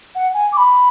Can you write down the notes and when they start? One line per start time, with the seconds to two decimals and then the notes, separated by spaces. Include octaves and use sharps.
0.15 F#5
0.34 G#5
0.52 D6
0.57 B5